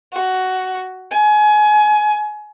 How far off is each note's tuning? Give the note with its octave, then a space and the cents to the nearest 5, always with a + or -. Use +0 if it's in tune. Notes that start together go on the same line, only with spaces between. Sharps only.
F#4 +10
G#5 +25